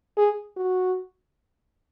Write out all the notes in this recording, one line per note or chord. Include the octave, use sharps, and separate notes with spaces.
G#4
F#4